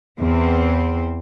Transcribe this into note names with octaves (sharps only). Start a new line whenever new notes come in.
E2 C4